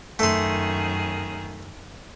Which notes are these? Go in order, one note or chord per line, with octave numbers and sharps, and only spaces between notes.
F#2 D#3 A3 G#4 C6